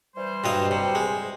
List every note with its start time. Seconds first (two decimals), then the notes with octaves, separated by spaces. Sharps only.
0.16 E3 G3 C5
0.44 G2 F#3 D#5
0.71 C3
0.95 G#3